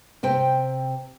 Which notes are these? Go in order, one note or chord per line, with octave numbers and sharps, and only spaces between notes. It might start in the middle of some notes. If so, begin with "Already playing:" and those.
C3 C5 G5